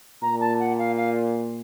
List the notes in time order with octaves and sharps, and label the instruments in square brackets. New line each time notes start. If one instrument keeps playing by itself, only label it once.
[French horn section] A#2 [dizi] A#5
[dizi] A5
F#5
F5
F5